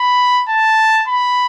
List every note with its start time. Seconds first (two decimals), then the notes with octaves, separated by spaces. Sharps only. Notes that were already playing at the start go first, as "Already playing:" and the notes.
Already playing: B5
0.49 A5
1.08 B5